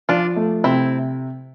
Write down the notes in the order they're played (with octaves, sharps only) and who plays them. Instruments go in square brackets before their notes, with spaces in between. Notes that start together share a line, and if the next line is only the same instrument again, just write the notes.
[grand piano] F3 [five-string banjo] D4 F4
[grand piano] A3
[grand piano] C3 [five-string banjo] C4 E4